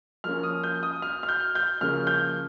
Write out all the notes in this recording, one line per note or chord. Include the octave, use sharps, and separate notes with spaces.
F3 A#3 C#4 F6
D#6
G6
D#6
F6
F6
G6
G6
C#3 F3 A#3 C#4 F6
G6